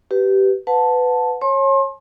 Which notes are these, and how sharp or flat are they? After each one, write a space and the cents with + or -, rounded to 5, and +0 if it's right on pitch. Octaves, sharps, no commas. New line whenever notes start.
G4 -20 B4 +0
B4 +20 F#5 -30 A5 +0
C#5 -25 A5 -40 C6 +35